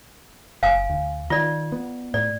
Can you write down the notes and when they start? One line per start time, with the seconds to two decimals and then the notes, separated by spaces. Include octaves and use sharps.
0.63 F#1 F5 G#5
0.90 D2
1.30 D#3 F4 D5
1.72 B3
2.14 A2 D5